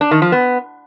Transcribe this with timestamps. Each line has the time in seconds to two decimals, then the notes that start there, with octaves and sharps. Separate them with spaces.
0.01 D4
0.11 D#3
0.22 F3
0.32 B3